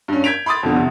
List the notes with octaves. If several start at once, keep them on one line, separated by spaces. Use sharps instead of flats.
G2 C#4
G6 G#6 B6 D7 F7
B5 C6 D6 D#6 A6
F2 B2 D3
E2 C3